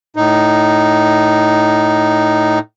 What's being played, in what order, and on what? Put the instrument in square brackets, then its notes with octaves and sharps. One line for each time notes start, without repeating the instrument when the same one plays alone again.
[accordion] A2 D#4